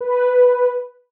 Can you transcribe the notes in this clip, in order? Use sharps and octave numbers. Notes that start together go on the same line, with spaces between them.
B4